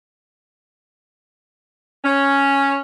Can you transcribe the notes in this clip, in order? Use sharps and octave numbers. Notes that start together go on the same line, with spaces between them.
C#4